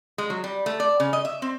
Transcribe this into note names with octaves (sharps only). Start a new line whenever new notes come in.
G#3
F#3
G3
A3
D5
C#3
D#5
E5
C4